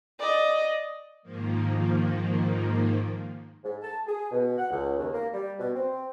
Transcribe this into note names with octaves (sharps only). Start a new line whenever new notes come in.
D5 D#5
G#2 D#3 F3 A#3
G#2
A5
G#4
B2
F#5
C#2
D#2
A#3
G3
B2
C4